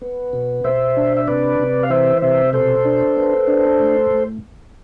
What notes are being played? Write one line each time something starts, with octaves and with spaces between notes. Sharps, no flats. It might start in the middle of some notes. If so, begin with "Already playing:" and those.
B3
B2
B2 C5 E5
D4
E5
C3 B4 D5
C3
F5
E3 C5 E5
C3 C5 E5
B2 A4 C5
D4
B3
D4
A2
A2